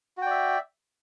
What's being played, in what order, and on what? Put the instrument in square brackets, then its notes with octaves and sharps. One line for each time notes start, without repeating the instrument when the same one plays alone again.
[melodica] F#4
G5
D5
E5